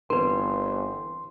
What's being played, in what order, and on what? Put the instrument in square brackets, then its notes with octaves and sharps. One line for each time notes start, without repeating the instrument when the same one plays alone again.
[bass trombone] G1 [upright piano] E3 C4 [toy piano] A#4 B4 [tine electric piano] C6